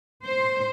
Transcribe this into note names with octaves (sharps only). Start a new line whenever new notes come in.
C5